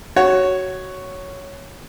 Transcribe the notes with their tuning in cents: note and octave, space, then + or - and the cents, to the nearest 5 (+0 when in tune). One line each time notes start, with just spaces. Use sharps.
F#4 +15 C#5 +0